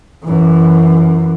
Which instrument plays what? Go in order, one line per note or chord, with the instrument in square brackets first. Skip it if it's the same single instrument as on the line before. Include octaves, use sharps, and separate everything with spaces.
[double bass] F#2 E3